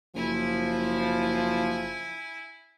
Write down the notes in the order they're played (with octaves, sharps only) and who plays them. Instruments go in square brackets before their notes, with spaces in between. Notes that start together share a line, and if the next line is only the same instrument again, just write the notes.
[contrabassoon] F#1 [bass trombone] F3 [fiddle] E4 G#5